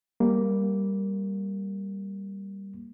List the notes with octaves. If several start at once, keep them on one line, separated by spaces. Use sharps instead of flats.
G3 A#3